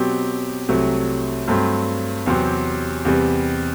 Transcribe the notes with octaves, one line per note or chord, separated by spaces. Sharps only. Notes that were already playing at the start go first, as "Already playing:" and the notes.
Already playing: B2 F#3 C4 G4
C2 C3 F#3 A3
G2 F#3 A3 C4
E2 C3 F#3 C4 G4
E2 C3 G3